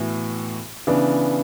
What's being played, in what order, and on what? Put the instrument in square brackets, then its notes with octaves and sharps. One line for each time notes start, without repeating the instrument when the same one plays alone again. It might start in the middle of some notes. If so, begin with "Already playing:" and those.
Already playing: [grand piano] A2 E3 B3 F#4
C#3 E3 B3 D4